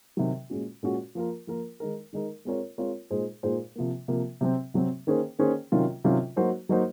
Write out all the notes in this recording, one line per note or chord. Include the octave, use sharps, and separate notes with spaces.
C3 D#3 F#3
A#2 G#3 C#4 F#4
A#2 G#3 C#4 F#4
F3 A#3 F4 A#4
F3 A#3 F4 A#4
D#3 G#3 D#4 A#4
D#3 G#3 D#4 A#4
G#3 C4 F4 A#4 C#5
G#3 C4 F4 A#4 C#5
A#2 G#3 D#4 G#4 C5
A#2 G#3 D#4 G#4 C5
C3 F3 A#3
C3 F3 A#3
C3 F#3 C4
C3 F#3 C4
D#3 A#3 C#4 G#4 C5
D#3 A#3 C#4 G#4 C5
C3 D#3 F#3 C#4 F4
C3 D#3 F#3 C#4 F4
F#3 A#3 D#4 F#4 C5
F#3 A#3 D#4 F#4 C5